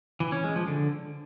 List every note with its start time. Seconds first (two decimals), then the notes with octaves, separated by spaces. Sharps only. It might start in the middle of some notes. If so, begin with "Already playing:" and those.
0.20 E3
0.32 C#4
0.44 G#3
0.56 F3
0.68 D3